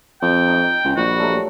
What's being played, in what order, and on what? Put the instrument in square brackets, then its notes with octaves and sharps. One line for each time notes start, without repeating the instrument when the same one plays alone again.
[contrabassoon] F2 [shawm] G5
[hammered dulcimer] D#4
[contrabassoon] C#2
[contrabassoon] A#1 [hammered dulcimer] G3 [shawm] F#4
[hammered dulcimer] F#3 A3 A#4